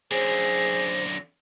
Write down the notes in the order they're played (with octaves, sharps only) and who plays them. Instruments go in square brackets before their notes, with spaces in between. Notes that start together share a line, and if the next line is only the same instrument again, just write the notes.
[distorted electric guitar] F#2 D3 [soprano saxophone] G#4 [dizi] C5 [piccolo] A#6